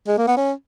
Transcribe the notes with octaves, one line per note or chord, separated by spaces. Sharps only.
G#3
A#3
B3
C#4